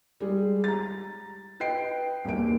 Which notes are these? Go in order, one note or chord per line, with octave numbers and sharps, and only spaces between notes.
G3 G#3 G#4
A#5 A6
B4 D#5 G5 C7 D7
A#1 D#2 A#3 D7